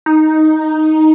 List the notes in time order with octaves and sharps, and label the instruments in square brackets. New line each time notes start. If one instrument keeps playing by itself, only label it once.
[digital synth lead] D#4